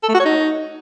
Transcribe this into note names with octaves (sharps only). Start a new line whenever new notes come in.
A4
A3
F#4
C#5
D#4